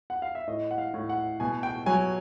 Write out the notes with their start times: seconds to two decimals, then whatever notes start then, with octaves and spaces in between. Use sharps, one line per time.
0.10 F#5
0.22 F5
0.35 E5
0.48 A2 D#5
0.71 F#5
0.78 F5
0.94 A2
1.09 F#5
1.40 B2 G#5
1.63 G5
1.86 F#3 G#5